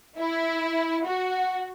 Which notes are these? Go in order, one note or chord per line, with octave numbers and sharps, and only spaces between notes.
E4
F#4